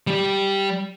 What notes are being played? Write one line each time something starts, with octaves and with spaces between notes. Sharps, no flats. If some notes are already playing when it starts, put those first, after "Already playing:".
G3 G4